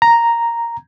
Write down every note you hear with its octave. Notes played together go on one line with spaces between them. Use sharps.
A#5